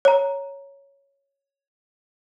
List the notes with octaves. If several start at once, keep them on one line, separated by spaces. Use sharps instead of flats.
C#5 A#5